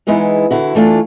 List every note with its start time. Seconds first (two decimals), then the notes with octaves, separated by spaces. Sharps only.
0.07 E3 G#3 B3 D#4 E4
0.50 D3 E4 F#4
0.75 E3 A3 D4 F4